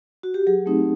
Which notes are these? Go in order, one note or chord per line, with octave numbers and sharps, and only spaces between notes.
F#4
G4
F#3 G#4
A3 C4 D#4